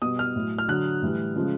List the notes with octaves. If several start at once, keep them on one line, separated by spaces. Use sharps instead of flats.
B2 G3 D#6
F6
A2 F#3
F6
D3 F#3 F#6
A2 E3 G3
C#3 F3 G#3